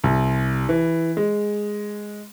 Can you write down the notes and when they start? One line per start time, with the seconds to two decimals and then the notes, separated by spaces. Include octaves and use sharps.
0.04 C2
0.69 E3
1.17 G#3